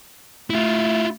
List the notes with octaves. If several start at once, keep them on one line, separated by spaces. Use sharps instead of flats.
A3 E4 F4